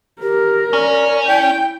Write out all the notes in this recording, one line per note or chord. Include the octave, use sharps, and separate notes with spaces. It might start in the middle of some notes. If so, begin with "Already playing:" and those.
G4 A#4
C#4 D5
E4 G5 G6